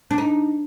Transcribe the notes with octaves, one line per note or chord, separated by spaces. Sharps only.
D4
D#4